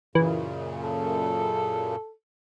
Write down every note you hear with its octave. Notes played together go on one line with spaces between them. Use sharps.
F#2 A#2 C#3 E3
A4